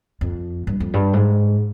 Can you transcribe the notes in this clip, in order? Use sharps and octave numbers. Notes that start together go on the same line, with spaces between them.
F2
G2
F2
G2
G#2